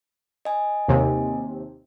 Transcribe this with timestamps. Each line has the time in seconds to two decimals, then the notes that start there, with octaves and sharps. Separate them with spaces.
0.45 D#5 G#5
0.88 D#2 C3